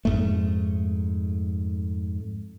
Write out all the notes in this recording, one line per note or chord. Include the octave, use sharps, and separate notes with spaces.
F2 G#2 A3